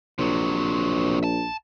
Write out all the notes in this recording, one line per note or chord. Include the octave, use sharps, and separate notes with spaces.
A#1 C3 F#3
A5